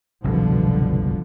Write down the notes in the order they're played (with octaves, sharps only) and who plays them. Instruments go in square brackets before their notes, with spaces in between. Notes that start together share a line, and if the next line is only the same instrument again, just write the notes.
[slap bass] F#1 C2 [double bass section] B2 D3 F3